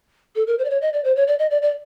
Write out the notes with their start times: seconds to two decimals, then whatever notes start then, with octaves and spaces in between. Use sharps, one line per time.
0.35 A4
0.47 A#4
0.59 C5
0.65 D5
0.70 C#5
0.82 D#5
0.93 D5
1.04 C5
1.16 C#5
1.27 D5
1.39 D#5
1.51 D5
1.62 D5